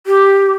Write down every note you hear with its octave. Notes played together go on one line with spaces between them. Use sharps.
G4